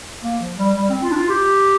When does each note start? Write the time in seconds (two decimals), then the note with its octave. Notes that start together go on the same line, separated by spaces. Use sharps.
0.23 A#3
0.40 F3
0.58 G3
0.76 G3
0.89 C4
1.03 F4
1.11 D4
1.16 F4
1.29 G4